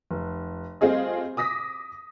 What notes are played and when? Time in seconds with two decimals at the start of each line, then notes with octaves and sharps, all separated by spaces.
0.11 F1
0.81 G3 A3 C4 F4 G#4 D#5
1.37 D6 D#6 A#6 B6